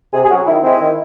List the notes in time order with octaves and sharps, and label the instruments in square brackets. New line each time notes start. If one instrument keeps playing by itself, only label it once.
[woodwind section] C3 G#4
G#4
F#3 C#4 F#4
D#3 E4
G#3 C4 E4
D#3